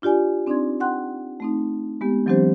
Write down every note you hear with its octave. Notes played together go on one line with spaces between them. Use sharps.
D4 F4 G4 D5 G#5
C4 D4 D#4 D5 C6 G#6
F#5 G5 C6 F#6
A3 C4 D#4
G#3 B3 G4
E3 F#3 C4 D4 G4 C5